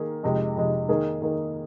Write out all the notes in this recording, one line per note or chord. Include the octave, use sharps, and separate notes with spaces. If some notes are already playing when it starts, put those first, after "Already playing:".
Already playing: D#3 A#3 G#4
F2 C3 G#3
F2 C3 G#3
D#3 A#3 G#4
D#3 A#3 G#4